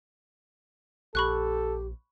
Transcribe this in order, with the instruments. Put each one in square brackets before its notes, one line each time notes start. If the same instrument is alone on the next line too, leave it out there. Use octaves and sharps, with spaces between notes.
[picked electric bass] A#1 [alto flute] G4 [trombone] A4 [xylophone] B5 C#6 F#6